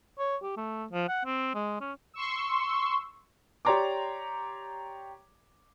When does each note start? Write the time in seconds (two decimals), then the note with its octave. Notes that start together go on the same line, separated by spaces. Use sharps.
0.19 C#5
0.42 G4
0.57 A3
0.92 F3
1.08 F#5
1.25 C4
1.54 G#3
1.81 C#4
2.14 C6 C#6 E6
3.65 G4 C#5 D5 A#5 C6 D6